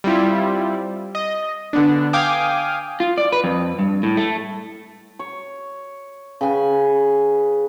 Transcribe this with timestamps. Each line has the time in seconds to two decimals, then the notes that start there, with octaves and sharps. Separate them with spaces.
0.04 G3 C4 E4 F4
1.15 D#5
1.73 D3 B3 D4
2.13 F5 G5 G#5 D6 D#6 F6
3.00 F4
3.18 D5
3.32 B4
3.44 F2
3.79 G2
4.03 A2
4.17 A3
5.19 C#5
6.41 C#3 B4 G5 G#5